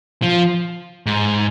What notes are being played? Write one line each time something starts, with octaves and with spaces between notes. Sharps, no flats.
F3
G#2